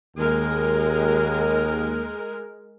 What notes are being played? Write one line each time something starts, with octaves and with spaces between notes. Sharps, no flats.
D#2 G#3 A#4